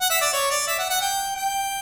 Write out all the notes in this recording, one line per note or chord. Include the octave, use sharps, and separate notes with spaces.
F#5
E5
D5
C#5
D5
E5
F#5
F#5
G5
G5